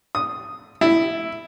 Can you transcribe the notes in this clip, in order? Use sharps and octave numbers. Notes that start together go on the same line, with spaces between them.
D#6
E4